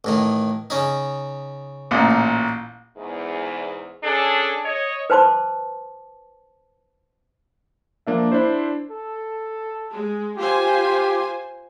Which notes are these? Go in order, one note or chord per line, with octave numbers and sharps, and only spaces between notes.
A1 A2 D#3
C#3 C#4 D#4
A1 A#2
E2 G#2
C#4 D4 G#4 A4
C#5 D#5
B4 C5 A5 C6 D6
F3 A#3 D4 E5
D4 E4 C5
A4
G#3
F4 G4 C5 G#5